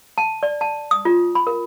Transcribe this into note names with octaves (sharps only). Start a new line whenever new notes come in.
A5
D5
A5
D#6
F4
B5
A#4